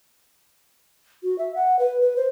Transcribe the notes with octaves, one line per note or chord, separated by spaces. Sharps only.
F#4
E5
F#5
B4
B4
C5